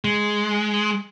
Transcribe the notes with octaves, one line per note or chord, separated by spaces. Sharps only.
G#3